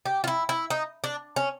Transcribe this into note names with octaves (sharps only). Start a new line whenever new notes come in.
G4
F4
E4
E4
D#4
D4
C#4